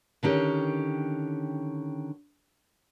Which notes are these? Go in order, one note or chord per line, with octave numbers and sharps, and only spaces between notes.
D3 D#3 C#4 G4